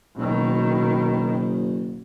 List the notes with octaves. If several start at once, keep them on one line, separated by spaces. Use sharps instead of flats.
F#1 B2 D#3